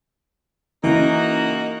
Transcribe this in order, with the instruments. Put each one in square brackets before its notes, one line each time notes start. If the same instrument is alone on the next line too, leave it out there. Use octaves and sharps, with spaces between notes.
[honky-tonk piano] C#3 E3 [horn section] A#3 D#4 F#4